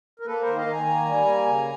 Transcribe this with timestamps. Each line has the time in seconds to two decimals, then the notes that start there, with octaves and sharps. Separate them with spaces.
0.20 A#4
0.26 A#3 A4 B4
0.41 A#4 C5
0.47 D#3
0.56 D#5 F5
0.66 D#3 G#5 A#5
0.86 A#3
1.05 G3
1.25 A#3
1.46 C#3